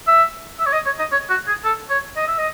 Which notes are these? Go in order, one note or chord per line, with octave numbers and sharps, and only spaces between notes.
E5
E5
C#5
D#5
C#5
D#5
C#5
F#4
G#4
A4
C#5
D#5
E5
D#5